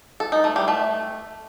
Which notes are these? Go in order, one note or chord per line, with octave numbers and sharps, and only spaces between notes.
A4
D#4
A3
G3
A3